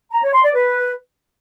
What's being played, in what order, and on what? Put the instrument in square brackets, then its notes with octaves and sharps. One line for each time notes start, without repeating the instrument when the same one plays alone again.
[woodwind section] A#5
C#5
C6
D5
B4